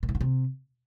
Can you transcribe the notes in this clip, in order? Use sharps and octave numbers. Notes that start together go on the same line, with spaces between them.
A#2
A2
G2
C3